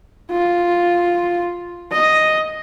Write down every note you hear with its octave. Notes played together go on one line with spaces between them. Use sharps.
F4
D#5